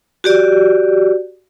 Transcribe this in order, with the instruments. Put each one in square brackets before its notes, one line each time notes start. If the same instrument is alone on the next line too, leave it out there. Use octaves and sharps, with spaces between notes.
[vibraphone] F#4 G4 D5